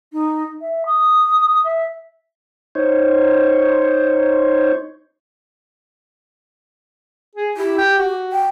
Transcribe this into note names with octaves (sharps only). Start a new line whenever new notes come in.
D#4
E5
D#6
E5
D#4 C5 C#5
G#4
E4 G4
G5
F#4
G5